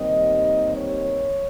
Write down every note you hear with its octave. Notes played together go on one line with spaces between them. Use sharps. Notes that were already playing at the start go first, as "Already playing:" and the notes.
Already playing: D#2 D#3 G3 C4 D#5
C#5